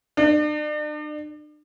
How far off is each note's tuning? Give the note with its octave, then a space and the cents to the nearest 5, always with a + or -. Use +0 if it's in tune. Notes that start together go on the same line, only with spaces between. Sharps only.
D4 +40